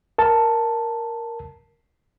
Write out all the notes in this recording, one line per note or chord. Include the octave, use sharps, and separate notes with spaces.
A#4 A5